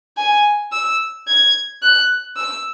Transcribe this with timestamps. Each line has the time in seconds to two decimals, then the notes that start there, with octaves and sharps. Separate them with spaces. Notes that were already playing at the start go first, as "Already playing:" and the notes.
0.17 G#5
0.72 E6
1.28 G#6
1.82 F#6
2.37 E6